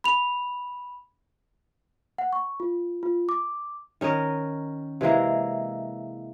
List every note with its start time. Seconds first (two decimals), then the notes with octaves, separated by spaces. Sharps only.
0.04 B5 F7
2.18 F#5
2.33 C#6
2.60 F4
3.03 F4
3.29 D6
4.01 D#3 C#4 A#4 D#5
5.01 C3 E3 G#3 A#3